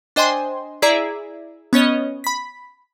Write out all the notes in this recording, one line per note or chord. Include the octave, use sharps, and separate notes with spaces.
D4 C5 D#5 G5 G#5 C6
E4 G#4 D5 E5 A#5
B3 C#4 C#5 D#5
B5 B6